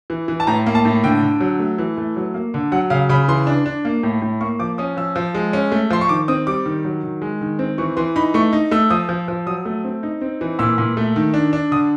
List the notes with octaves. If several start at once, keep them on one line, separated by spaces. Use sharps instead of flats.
E3
E3
A5
A2 A#5
A#3
A5
A2
D3 G5
D3
F#3
A3
E3
A3
F#3
A#3
D3
F#3 F#5
C#3 F5
C#3 B5
E3 C6
D4
D4
A#3
A2
A2
A#3 C#6
F3 D6
C#4 D#6
F3 E6
F3
G#3
C#4
A3
F3 C6
C#6
D#3 D6
C4 D#6
G3 D6
D#3
F#3
D#3
G#3
D#3
C4
E3 C#6
E3 C6
D#4 B5
A3 C#6
D#4
A3 E6
F3 D#6
F3
F3
F#3 D#6
A3
C4
D#4
C4
E3
A#2 E6
A#2
A3
D#3
D4
D4
D3 D#6